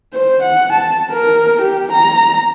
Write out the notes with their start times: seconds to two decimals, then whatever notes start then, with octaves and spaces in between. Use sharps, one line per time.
0.14 C5
0.43 F#5
0.73 A5
1.12 A#4
1.61 G4
1.92 A#5